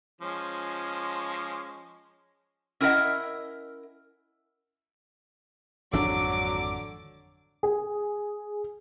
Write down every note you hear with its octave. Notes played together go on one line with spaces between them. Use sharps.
F3 G#3 C#4
C#4 E4 A#4 D#5 E5 F#5
G#1 F2 D3 F#3 D4 D6
G#4